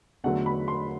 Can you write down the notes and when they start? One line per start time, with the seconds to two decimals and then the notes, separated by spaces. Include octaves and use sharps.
0.24 E2 D3 F#3 A3 F#5
0.46 B5
0.68 C6